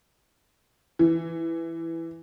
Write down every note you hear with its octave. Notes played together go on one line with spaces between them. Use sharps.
E3